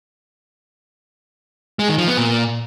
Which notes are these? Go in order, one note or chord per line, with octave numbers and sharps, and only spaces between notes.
G#3
D#3
F3
B3
A#2